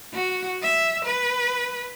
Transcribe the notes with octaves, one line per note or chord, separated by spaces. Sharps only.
F#4
E5
B4